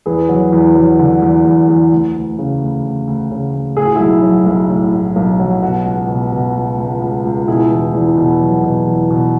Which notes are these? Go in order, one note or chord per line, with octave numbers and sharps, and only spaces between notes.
E2 G#4 B4
F#3
E2
F#3
D3
E2
E2
E2
D2
D2
C#3
D2
D2
D2
C#3
D2
A2 G#4
F#4
B1 E4 G#4
F#3
B1
A2
A2
B1
F#3
B2 F#4
C#2
B2
B2
C#2
C#2
C#2
C#2
B2 E4 G#4
E2
E2
B2
F#3
B2
E2
B2